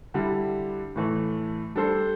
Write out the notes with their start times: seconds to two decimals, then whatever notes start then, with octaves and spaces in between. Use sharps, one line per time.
0.14 D3 G3 E4
0.95 A2 E3 A3
1.75 G3 D4 A4 C5